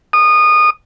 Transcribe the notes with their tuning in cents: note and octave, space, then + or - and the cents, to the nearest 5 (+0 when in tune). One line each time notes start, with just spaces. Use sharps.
D#6 -25